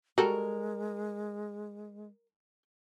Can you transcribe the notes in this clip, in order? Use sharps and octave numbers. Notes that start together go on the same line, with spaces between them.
G3 G#3 F#4 A4 A#4